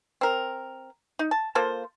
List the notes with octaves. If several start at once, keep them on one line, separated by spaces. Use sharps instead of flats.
C4 A#4
D#4
A5
A#3 F4 A4 C5